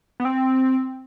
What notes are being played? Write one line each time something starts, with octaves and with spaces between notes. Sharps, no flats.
B3
C4